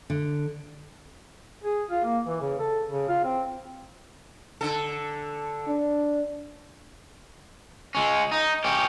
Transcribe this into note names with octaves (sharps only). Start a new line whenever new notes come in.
D3
G#4
F4
A#3
E3
C#3
A4
C#3
F4
C4
D3 A4
D4
G#3 C#4
D#4
C#4 G4